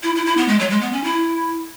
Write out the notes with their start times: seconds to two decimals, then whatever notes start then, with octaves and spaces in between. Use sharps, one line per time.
0.03 E4
0.15 E4
0.26 E4
0.37 B3
0.48 G#3
0.60 F#3
0.70 G#3
0.81 B3
0.93 C#4
1.04 E4